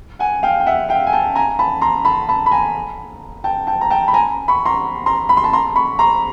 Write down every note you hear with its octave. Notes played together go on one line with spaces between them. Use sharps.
F#5 G#5
F5 G5
G5
E5 F#5
F5 G5
G#5
G5 A5
G#5 A#5
A5 B5
A#5 C6
A5 B5
A5 B5
B5
G#5 A#5
G5 A5
G5 A5
A#5
G5 A5
B5
G#5 A#5
B5 C#6
A#5 C6
A#5 C6
B5
C6
A5 B5
A#5 C6
B5 C#6
A#5 C6